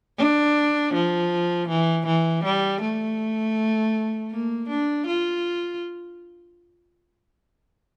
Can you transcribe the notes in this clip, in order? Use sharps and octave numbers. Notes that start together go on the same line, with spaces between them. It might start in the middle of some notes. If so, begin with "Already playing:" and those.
D4
F3
E3
E3
G3
A3
A#3
D4
F4